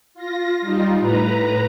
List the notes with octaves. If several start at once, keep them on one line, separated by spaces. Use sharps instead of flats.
F4 A#6
G3 D#4 F4
A2 B4 A#5